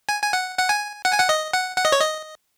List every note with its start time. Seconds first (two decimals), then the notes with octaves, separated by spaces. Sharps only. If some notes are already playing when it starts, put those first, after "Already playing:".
0.09 G#5
0.22 G#5
0.33 F#5
0.59 F#5
0.69 G#5
1.05 F#5
1.13 G#5
1.20 F#5
1.29 D#5
1.53 F#5
1.77 F#5
1.85 D#5
1.92 C#5
2.00 D#5